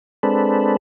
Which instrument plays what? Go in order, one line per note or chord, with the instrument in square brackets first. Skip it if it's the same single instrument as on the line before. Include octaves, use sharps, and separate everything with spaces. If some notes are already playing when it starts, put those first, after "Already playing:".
[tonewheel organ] G#3 C4 D4 A4 B4